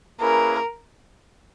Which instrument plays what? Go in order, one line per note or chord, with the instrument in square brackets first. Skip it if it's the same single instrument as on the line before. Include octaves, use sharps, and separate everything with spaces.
[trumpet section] A#3 C#4 E4 G#4 B4 [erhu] A#4